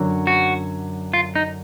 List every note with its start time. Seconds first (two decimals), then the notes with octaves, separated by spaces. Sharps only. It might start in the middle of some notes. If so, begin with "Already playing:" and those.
Already playing: F#2 D3 F#3
0.27 F#4
1.13 F4
1.35 D#4